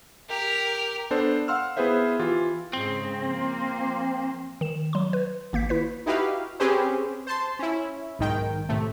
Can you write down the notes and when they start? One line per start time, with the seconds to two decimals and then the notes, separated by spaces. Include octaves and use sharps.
0.29 G4 A#4
1.11 B3 D4 A4 C5
1.48 F5 F#5 C6 E6 F6
1.77 B3 E4 G#4 B4 C5 E5
2.19 E3 F4 G4
2.73 G#2 C#3 C4
3.23 F3 A#3 C5
4.61 D#3 E7
4.93 F#3 C6
5.13 B4
5.53 G#1 A#3 G6 B6
5.69 E4 B4 B6
6.06 D#4 E4 F#4 G4 B4 F5
6.60 C4 C#4 G4 G#4 B4 C5
7.27 C5 A5 C6
7.59 C#4 E4
8.19 B1 G#2 D#3 G5
8.69 A2 C3 A3